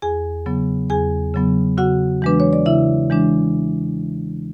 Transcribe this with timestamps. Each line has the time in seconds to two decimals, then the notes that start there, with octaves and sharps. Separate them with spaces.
0.02 E2 G#4 G#5
0.46 C#3 F#3 B3
0.90 E2 G#4 G#5
1.34 C#3 F#3 B3
1.78 C#3 F#4 F#5
2.22 E3 G#3 D4 B4
2.40 C#5
2.53 D5
2.66 C#3 E4 E5
3.10 E3 G#3 D4